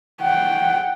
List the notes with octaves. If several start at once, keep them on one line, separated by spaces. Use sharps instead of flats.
F#5 G5